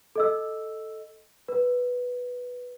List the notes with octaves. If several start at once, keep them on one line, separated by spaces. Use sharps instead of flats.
A4 D#5 E6
B4